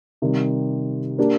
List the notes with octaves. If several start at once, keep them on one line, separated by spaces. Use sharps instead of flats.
C3 D#3 G3
A#3 D4 G4